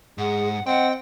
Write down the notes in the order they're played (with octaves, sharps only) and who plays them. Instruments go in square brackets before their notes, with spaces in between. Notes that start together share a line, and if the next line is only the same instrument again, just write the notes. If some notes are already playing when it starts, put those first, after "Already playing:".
[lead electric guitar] G#2 [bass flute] G#4 [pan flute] F#5
[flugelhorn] C4 [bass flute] D#5 [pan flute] F#5 [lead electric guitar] G5